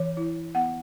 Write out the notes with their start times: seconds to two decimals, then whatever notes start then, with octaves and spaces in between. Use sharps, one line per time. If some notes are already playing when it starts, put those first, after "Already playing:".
Already playing: E3 C#5
0.17 E4
0.55 B3 F#5